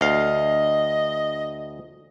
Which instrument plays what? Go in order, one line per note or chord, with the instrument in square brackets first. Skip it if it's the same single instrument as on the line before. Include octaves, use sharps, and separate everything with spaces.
[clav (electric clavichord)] D2 F5 [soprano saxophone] D#5